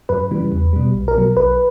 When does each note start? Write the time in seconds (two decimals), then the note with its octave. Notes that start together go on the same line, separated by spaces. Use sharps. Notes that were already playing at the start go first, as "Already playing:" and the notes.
0.09 F#2 B4
0.31 C#3 E3 G3
0.52 E2
0.73 B2 G3
0.94 B1
1.08 A#4
1.15 B2 F#3
1.36 B1 B4